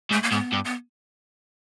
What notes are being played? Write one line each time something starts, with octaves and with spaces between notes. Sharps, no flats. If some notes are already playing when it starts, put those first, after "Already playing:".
G#2 A3
A#3
G#2 B3
G2
B3